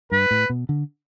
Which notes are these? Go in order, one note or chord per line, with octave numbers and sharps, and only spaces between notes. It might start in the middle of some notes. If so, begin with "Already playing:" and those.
G2 B4
A2
B2
D3